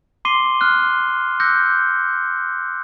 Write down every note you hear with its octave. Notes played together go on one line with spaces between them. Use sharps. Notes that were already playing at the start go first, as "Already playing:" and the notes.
C6 D6 C7 D#7 G7
F6 F#6
D6 E6 F#6 G6 A#6 C#7